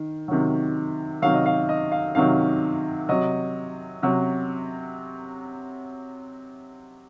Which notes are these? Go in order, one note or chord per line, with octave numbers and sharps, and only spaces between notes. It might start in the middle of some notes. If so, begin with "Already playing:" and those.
Already playing: D#3
C3 D#3 F#3
C3 D#3 F#3 F5
D#5
F5
D#5
F5
C3 D#3 F#3 F5
C3 F#3 D#5
C3 F#3